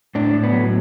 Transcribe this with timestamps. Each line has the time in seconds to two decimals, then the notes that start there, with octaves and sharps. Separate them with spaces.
0.15 A2 D4
0.34 A2
0.43 B3
0.52 F#3